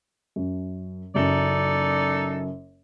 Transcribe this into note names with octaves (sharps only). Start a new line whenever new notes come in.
F#2
F#1 F#2 D#4 A4 D5